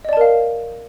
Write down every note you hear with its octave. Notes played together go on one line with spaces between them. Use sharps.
A#4 D5 D#5 F5 A5